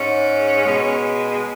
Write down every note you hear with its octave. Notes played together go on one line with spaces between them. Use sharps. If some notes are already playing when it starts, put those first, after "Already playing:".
Already playing: G#2 G#3 C#4
B2 G#3